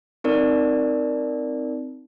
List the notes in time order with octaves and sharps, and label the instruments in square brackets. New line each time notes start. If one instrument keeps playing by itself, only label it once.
[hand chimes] C4 D#4 A#4 D5